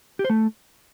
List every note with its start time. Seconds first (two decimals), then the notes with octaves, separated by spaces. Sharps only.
0.19 G4
0.24 C5
0.30 A3